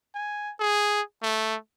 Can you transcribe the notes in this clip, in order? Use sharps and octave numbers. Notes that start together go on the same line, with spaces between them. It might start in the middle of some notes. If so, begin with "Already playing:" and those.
G#5
G#4
A3